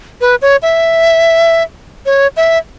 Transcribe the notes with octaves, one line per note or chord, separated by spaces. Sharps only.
B4
C#5
E5
C#5
E5